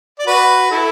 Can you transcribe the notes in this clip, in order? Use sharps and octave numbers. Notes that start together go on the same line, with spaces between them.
D5
F#4 B4
E4 A4